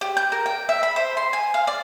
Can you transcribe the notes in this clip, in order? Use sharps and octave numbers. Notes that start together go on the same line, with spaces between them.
G4
G6
A#4
G5
E5
B5
C5
C6
G#5
F5
D5